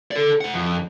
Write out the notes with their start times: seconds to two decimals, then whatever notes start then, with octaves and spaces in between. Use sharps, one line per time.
0.11 A4 D5
0.41 C5 F#5
0.53 F2